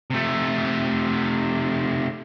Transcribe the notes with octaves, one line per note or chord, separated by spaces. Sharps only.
C3 A3